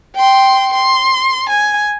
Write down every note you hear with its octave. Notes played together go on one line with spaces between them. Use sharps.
G5 C6
C6
G#5